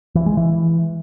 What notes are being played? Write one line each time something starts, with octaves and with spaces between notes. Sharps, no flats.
E3
G#3
E3